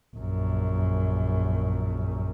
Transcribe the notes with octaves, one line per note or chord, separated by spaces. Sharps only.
A#1 F#2